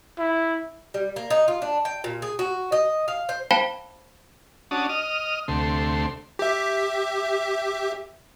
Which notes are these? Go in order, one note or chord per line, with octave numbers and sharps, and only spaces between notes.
E4
G3
A#3
D#4
F4
D4
G5
A#2
G#4
F#4
D#5
F5
C5
C5 F5 G5 A5 B5
C#4 D4 F#4 A5 D#6
D#5 D#6 F6
D2 C3 A3 C6
G4 E5